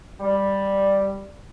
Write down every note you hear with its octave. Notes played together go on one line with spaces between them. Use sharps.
G3